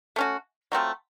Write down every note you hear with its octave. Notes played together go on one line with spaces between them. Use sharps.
A3 C#4 F#4
F#3 A3 C4 F4